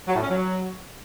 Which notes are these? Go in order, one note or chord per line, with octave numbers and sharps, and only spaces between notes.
F#3
A2
C#4
F#3